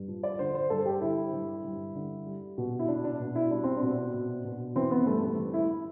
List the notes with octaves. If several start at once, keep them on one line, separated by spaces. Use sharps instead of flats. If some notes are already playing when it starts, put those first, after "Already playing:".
Already playing: G2
F3
D5
D3 C5
C5
G2 A4
G4
D3 E4
G2
G2
D3
G3
B2
E4
B2 D4
D4
B2
E4
G3 D4
C4
D4
B2
B2
B2
E3 C4
B3
G2 A3
A3
E3
E4